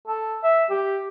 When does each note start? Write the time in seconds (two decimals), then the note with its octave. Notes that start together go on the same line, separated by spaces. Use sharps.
0.08 A4
0.44 E5
0.70 G4